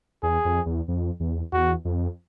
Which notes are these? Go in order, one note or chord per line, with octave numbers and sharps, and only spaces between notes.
E2 G#4
F2
E2
F2
E2
E2 F#4
F2